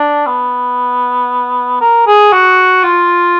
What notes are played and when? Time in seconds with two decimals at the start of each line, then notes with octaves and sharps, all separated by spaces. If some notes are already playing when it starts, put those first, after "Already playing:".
Already playing: D4
0.26 B3
1.81 A#4
2.07 G#4
2.32 F#4
2.83 F4